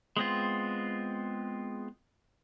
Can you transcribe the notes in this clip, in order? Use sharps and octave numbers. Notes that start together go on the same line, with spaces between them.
G#3 B3 C4 F4